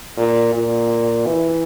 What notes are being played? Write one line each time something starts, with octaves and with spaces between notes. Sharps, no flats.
A#2
A#2
E3